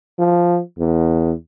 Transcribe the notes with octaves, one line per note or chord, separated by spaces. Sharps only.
F3
E2